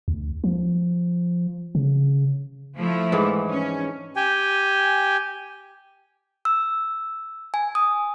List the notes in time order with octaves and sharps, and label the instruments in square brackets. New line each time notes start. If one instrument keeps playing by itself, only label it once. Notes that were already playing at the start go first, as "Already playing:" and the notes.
[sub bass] D2
F3
C#3
[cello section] F3 A3 E4
[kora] G#2 E3 D4
[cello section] C#4
[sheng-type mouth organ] G4 G5 G#5
[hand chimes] E6
G#5
D#6